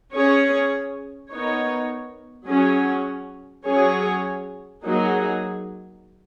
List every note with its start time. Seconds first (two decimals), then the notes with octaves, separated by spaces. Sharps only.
0.12 C#4 G#4 C#5
1.30 B3 D#4 A#4 C#5
2.48 F#3 C#4 G#4
3.66 F#3 C#4 G#4 C#5
4.84 F#3 A#3 D#4 G#4